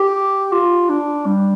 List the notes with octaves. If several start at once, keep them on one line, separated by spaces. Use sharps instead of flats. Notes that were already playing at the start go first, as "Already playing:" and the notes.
Already playing: G4
F4
D4
G3